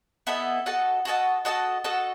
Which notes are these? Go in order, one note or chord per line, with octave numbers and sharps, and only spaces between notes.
B3 E4 A4 D#5
F#4 A4 D#5 A5
F#4 A4 D#5 A5
F#4 A4 D#5 A5
F#4 A4 D#5 A5